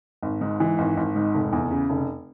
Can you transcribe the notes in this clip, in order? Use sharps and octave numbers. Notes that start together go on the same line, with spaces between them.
G#1
G#2
E3
G#1
G#1
G#2
F1
E2
C#3
F1